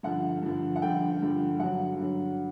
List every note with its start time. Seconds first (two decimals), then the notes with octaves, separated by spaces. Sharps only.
0.03 G2 D3 F3 F#5
0.42 G2 D3 F3
0.76 F#5
0.82 G2 D3 F3 G5
1.21 G2 D3 F3
1.59 G2 D3 F#3 F#5
1.99 G2 D3 F#3